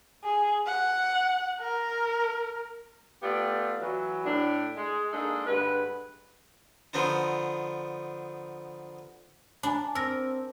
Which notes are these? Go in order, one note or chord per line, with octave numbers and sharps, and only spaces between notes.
G#4
F#5
A#4
A3 B3 F4 G4 D5
E3 F#3
A2 D4
G#3
G#3 A#3 D4 D#4 A4
G2 D3 G#3 B4
D3 F3 B3 D4 D#4
D4 G#5 A#5 B5
C4 A#4 E6 A#6